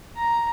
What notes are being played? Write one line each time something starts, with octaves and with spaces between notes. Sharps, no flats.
A#5